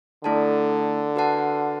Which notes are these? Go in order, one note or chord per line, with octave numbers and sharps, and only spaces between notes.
D3 A3 E4 A4 D5 A5
F#4 B4 F#5 A5